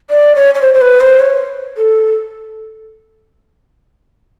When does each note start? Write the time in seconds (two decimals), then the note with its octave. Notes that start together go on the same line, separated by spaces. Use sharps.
0.10 D5
0.35 C#5
0.54 C#5
0.61 C5
0.74 C5
0.81 B4
1.00 C5
1.19 C#5
1.77 A4